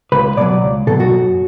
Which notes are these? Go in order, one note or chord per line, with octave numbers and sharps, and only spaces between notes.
C#2 B4
B2 F#3 D5
C#2
B2 F#3 A4
F#4
F#2